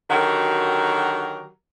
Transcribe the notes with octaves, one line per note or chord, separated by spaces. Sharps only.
D3 D#3 F#3 F#4 G4 A#4